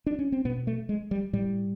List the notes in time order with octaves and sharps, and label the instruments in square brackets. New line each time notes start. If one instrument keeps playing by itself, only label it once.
[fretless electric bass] D4
C#4
C4
B2 B3
A3
G#3
G3
A2 G3